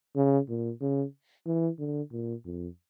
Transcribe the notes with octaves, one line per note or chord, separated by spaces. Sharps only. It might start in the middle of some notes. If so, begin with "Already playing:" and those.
C#3
A#2
C#3
E3
D3
A#2
F2